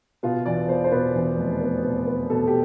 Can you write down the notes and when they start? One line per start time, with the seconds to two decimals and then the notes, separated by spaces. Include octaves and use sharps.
0.23 B2 F4
0.46 E2 D5
0.69 B3 C5
0.84 C5
0.92 B2 B4
1.15 E2
1.37 F1
1.61 B3
1.84 B2
2.07 B3
2.30 B2 A4
2.47 G4